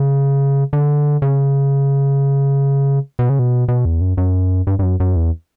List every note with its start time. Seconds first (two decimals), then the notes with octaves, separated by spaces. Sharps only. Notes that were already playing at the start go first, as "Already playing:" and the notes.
Already playing: C#3
0.73 D3
1.22 C#3
3.19 B2
3.29 C#3
3.39 B2
3.68 B2
3.85 E2
4.01 F#2
4.17 F#2
4.67 G2
4.79 G2
4.83 F#2
5.00 F#2
5.16 E2